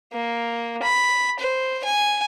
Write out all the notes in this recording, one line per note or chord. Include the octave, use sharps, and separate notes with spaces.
A#3
B5
C5
G#5